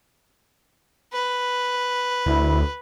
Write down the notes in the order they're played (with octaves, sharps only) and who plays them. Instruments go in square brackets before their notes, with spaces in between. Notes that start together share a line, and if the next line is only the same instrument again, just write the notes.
[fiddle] B4
[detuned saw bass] D2 [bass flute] E4